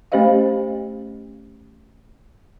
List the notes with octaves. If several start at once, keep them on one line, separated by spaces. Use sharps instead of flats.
A3 C#4 G4 C5 D#5 F5